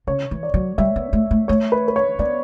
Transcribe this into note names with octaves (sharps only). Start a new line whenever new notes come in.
C#3 C#5
E3
D5
F#3
G3 E5
B3
A3
A3
A3 C#5
B4
B4
C#5
B3 D5